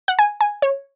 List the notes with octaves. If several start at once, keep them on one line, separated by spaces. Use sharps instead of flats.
F#5
G#5
G#5
C#5